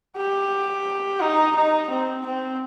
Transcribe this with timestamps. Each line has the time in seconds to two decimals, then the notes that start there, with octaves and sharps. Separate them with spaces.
0.16 G4
1.21 D#4
1.55 D#4
1.90 C4
2.26 C4